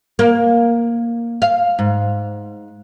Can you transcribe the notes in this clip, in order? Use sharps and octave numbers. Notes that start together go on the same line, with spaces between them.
A#3
F5
G#2